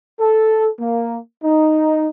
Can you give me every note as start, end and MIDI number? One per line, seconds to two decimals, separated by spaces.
0.20 0.69 69
0.79 1.18 58
1.43 2.08 63